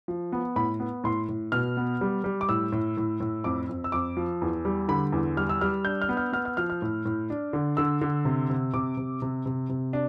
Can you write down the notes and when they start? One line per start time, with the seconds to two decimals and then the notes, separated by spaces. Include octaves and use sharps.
0.08 F3
0.32 B3
0.56 A2 B5
0.80 B3
1.04 A2 C6
1.29 A2
1.52 B2 F6
1.77 B3
2.01 G3
2.24 G3
2.41 D6
2.49 A2 E6
2.72 A2
2.97 A2
3.20 A2
3.44 F2 D6
3.69 F2
3.84 E6
3.92 F2 D6
4.17 F3
4.42 E2
4.65 G3
4.88 D3 B5
5.12 E2
5.37 G3 F6
5.49 E6
5.61 G3 F6
5.85 D4 G6
6.02 F6
6.09 B3
6.17 F6
6.33 B3 F6
6.45 F6
6.57 F3 F6
6.70 F6
6.82 A2
7.05 A2
7.30 D4
7.53 D3
7.77 D3 E6
8.01 D3
8.25 C3
8.50 C3
8.74 C3 D6
8.97 C3
9.22 C3
9.46 C3
9.69 C3
9.93 D4